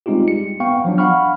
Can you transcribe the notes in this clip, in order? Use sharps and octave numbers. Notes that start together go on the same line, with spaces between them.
G3 G#3 C4 D#4 F4 G4
C#7
B3 F5 G5 C#6
F3 F#3 D4
F5 F#5 B5 C#6 F6